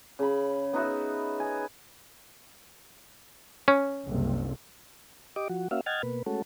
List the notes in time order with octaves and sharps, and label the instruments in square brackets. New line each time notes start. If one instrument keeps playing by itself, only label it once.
[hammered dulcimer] C#3 B5
B3 D#4 F#4 E5
G#5
[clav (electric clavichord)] C#4
[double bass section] F#1 C2
[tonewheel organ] G4 D#5 D6
F3 F#4
A#3 C#4 F#4 E5 F5
D#5 F#5 G5 F6 G#6 A6
B2 A#3 B4
G#3 A3 C#4 F#4 A4